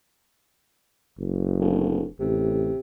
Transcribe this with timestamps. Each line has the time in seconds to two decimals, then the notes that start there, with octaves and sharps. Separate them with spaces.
1.19 F#1
1.59 D1
2.20 A1 C3